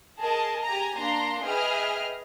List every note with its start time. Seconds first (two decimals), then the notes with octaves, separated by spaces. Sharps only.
0.21 G#4 A#4 D#5 A5
0.64 G4 G#5 A#5
0.97 A#3 D4 A#5 C6
1.43 G#4 B4 D#5 E5 G5 F6